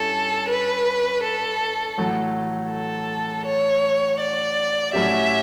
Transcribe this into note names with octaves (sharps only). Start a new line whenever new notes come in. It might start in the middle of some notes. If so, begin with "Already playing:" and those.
Already playing: G2 C#4 E4 A4
B4
A4
A1 A2 F#3 A3
A4
C#5
D5
A2 F#3 C#4 G4 E5